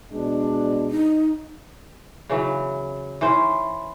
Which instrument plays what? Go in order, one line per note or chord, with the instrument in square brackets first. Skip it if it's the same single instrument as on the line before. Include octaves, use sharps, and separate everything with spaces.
[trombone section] B2 G#3 D4
[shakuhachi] D#4
[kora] C#3 E3 F#3
E3 C#4 C5